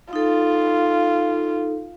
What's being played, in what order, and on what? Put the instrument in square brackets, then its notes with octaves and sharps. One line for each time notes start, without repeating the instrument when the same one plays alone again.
[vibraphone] D#4 A4 [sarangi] F4